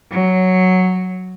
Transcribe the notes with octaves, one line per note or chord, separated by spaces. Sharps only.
F#3